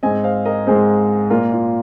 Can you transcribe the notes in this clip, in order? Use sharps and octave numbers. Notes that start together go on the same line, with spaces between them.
G#2 G#3 C4 D#5 G#5
C5 F5
A#4 D#5
G#2 G#3 C4 G#4 C5
A#2 A#3 F4 A#4
F4